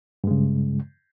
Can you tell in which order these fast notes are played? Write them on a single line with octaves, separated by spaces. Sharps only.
G2 G#3 C#3